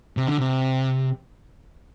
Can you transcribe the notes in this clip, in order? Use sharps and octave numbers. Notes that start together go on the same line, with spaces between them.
C3
D3
C3